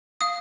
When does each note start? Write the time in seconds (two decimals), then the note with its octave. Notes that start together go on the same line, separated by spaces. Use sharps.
0.21 F5 D#6